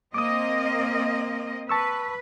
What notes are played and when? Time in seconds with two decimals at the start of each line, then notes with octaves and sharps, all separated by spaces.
0.14 A#3 C4 D#5 D6 D#6
1.69 B4 A5 C#6 E6